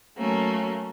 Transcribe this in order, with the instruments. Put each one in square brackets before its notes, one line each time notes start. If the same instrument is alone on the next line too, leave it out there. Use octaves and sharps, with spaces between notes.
[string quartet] F#3 A3 A#3 C#4